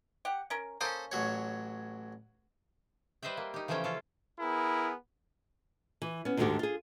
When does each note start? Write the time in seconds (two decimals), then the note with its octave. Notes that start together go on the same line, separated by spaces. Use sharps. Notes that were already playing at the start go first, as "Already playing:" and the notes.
0.25 G4 F#5
0.50 C#4 A#4
0.81 A#3 C#4 A4 C5 D#6
1.12 A1 F#3 C#5
3.22 G3 B4 C5 D#5 E5 G5
3.37 A#3
3.54 D#4 G4
3.68 C#3 E3 F3 A3 C#4 G5
3.84 C#4 F4 A4
4.40 B3 E4 G#4 A#4
6.02 E3
6.25 B3 C#4
6.37 D2 G#2 D3 D#3 F#4 G4
6.59 F4 G#4